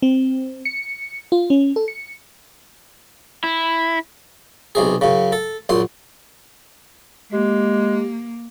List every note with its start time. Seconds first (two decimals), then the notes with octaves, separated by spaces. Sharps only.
0.02 C4
0.65 C#7
1.32 F4
1.50 C#4
1.76 A4
1.88 C#7
3.44 E4
4.75 B1 C3 G#4
5.01 F#2 C#3
5.32 A4
5.69 A#1 F#2 C6
7.32 G#3 A#3 G4